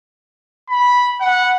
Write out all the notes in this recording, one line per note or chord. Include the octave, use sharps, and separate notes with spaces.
B5
F#5